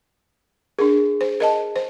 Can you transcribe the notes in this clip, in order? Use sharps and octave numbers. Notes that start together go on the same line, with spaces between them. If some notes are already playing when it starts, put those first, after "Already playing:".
D4 G#4 A#4
C5
A#4 D#5 A5
C5